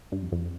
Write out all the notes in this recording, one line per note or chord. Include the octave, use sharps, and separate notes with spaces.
G2
F2
F2